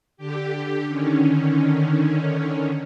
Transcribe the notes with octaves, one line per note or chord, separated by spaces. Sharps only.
D3 G4
D3 D#3 C#4